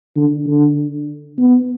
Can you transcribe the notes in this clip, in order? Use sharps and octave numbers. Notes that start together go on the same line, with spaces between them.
D3
D3
B3